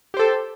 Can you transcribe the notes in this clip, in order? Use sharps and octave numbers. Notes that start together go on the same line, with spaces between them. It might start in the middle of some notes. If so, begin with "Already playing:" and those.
G4 A4 C5